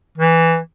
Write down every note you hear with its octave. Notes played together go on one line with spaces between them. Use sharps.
E3